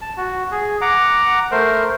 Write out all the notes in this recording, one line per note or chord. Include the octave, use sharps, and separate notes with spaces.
A5
F#4
G#4
F#5 A#5 D6
A3 A#4 C5